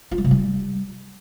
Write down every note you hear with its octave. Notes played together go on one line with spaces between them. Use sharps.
F4
G3
C3
G3